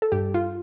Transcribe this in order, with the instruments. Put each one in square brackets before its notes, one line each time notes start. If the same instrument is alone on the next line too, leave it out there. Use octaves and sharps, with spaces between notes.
[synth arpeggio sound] A4
G2 G4
F4